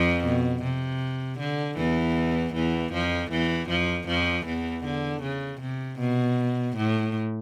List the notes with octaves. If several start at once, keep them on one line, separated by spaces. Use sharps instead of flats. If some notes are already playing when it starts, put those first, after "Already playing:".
Already playing: F2 F3
B2
C3
D3
E2 E3
E2 E3
F2 F3
E2 E3
F2 F3
F2 F3
E2 E3
D3
C#3
C3
B2
A2